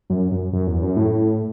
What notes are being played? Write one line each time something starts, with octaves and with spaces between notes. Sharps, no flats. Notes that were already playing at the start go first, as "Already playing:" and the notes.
F#2
F#2
F#2
E2
F#2
A2